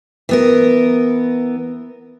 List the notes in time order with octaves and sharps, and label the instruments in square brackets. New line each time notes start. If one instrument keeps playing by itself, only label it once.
[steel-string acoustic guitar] E3 B3 A#4